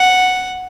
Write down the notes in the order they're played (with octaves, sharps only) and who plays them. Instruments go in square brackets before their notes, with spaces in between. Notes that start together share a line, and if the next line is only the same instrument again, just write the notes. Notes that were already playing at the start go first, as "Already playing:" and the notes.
Already playing: [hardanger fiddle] F#5